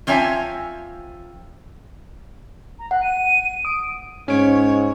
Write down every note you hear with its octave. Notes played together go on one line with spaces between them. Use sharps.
F3 C4 C#5 E5 G#5 A5
A#5
F#5 F#6
D#7
D#6 D7
G#2 C#4 C#5 D7